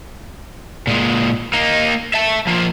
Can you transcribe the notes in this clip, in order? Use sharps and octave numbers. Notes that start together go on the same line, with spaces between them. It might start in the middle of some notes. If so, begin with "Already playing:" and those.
A#2 G#3
A#3 D#4
E5 A5
F3 A#3